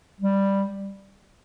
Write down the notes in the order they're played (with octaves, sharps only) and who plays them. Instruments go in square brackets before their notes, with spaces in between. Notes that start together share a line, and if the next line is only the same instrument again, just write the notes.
[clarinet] G3